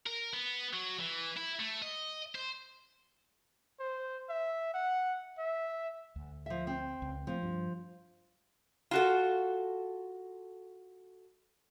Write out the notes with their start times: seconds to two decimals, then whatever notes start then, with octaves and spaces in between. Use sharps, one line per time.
0.06 A#4
0.33 B3
0.73 F#3
1.00 E3
1.37 E4
1.60 A3
1.82 D#5
2.35 C5
3.80 C5
4.29 E5
4.74 F#5
5.38 E5
6.16 D2
6.46 F3 E5
6.67 C4
7.02 C#2
7.27 F3 A3 C4
7.43 G2
8.91 F4 F#4 A4